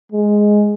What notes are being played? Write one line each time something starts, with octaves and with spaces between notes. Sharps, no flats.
G#3